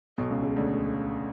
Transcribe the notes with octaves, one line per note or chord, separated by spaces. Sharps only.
B1 B2
C#2 C#3
C#2 C#3
D2 D3